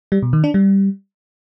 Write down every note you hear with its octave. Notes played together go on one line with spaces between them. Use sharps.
G3
B2
D#3
D4
G3